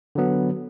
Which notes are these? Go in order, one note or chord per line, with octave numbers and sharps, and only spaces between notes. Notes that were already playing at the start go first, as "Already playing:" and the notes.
D3 F#3 B3